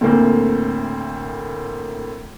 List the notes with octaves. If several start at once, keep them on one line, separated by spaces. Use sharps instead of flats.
D2 A2 A#3 C4